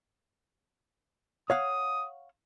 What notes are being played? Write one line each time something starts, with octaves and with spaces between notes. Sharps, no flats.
C#5 F5 F#5 D#6